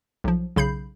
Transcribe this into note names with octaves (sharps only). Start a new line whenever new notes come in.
B1 F3
B1 C#3 B5 G6 C7